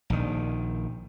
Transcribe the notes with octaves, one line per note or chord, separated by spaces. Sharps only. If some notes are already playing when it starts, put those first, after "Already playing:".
A#1 D#3